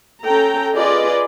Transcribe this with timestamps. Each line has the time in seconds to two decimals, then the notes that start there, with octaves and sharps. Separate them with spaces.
0.24 C#4 A4 G5 A#5
0.75 F4 G#4 B4 D5 D#5